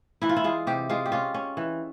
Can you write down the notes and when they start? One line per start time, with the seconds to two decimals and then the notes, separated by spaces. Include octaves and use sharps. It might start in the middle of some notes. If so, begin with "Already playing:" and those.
0.22 E3 E4
0.29 F4
0.37 E4
0.44 G#3 F4
0.67 C3 G4
0.90 G#3 F4
1.06 G4
1.12 C#4 F4
1.34 C#4
1.57 E3